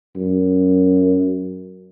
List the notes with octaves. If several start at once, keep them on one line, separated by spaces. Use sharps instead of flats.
F#2